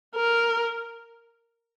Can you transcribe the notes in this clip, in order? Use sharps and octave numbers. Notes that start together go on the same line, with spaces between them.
A#4